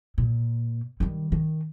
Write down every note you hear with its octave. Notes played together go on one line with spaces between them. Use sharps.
A#2
D#3 G3
D#3